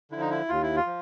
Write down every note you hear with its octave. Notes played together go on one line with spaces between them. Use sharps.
D3 F3 E4
D#4
E4
D#2 F4
E4
F4
F3